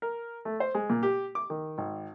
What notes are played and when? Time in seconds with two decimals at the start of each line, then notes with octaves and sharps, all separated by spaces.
0.02 A#4
0.45 A3
0.60 C5
0.74 G#3
0.90 A#2
1.03 G4
1.35 D6
1.50 D#3
1.78 G#1